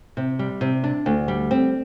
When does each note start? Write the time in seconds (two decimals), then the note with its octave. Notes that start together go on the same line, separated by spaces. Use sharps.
0.17 C3
0.39 G3
0.61 C3
0.84 D4
1.06 D2
1.28 G3
1.51 C4